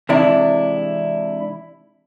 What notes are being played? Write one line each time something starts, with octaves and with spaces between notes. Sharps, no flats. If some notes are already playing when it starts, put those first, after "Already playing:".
C3 E3 G#3 D4 E4